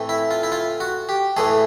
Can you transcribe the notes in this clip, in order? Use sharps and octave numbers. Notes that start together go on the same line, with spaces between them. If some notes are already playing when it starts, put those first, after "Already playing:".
Already playing: A2 E3 A3 C4
E4
F4
E4
F4
F#4
G4
A2 E3 A3 G#4